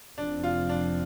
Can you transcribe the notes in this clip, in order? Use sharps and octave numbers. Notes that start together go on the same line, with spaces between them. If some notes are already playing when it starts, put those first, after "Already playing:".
F1 F2 F3 C4 D4
F4
D4